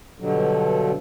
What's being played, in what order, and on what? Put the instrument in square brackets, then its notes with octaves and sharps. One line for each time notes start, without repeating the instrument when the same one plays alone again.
[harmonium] G2 B2 D3 F#3